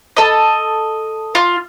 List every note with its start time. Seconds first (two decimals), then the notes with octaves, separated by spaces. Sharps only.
0.17 A4 D#5
1.35 F4